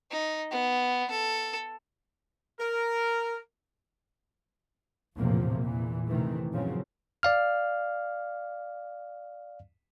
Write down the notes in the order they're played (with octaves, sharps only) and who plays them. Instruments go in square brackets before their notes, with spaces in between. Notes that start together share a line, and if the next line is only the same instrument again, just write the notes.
[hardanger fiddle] D#4
B3
A4
[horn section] A#4
[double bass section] A#1 E2 A2 C3 F3 A#3
E2 A#2 E3
C3 D#3 E3 A3
F#2 A#2 C#3 F3 F#3 C4
[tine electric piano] D5 F5 F6